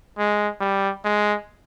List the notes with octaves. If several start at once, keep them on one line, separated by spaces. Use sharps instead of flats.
G#3
G3
G#3